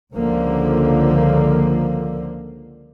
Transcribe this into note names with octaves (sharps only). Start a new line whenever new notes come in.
C#2 D3 F3 A#3